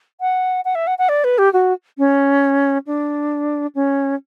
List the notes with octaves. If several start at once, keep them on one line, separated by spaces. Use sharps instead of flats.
F#5
F#5
E5
F#5
F#5
D5
B4
G4
F#4
C#4
D4
C#4